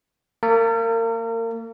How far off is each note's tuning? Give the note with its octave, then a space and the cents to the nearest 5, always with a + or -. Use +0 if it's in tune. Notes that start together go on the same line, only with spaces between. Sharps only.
A#3 -30 A#4 -40